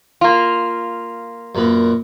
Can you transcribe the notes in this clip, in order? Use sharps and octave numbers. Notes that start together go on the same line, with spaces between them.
A#3 F4
F#2 A#2 B3